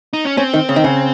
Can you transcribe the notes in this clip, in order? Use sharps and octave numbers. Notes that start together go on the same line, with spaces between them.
D#4
C#4
C4 C#4
D#3
C#3
D#3
C#3